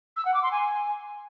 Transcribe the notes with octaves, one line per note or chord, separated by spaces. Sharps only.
E6
F#5
D6
C6
G#5